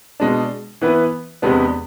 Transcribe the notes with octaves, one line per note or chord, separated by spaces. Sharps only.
B2 G#3 D4
E3 B3 E4 B4
E2 C3 G#3 B3 D4